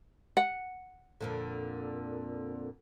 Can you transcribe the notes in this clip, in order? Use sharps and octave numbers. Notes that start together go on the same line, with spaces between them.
F#5
F2 A#2 D3